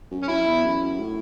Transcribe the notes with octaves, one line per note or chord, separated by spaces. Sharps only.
F#2
C#4
F#2 E4
E2
F#2
A2